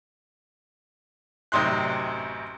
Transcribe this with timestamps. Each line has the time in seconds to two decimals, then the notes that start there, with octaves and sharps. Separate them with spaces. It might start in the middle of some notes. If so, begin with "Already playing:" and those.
1.52 A1 F#2 C3 D#4 C6 F#6